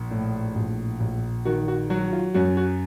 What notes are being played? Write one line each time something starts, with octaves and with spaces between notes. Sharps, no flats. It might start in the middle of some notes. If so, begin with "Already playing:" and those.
Already playing: A#1
A2
A#1
A#1
D#3 F#4
F#4
F#3 F#4
F4
F#2 F#4
F#4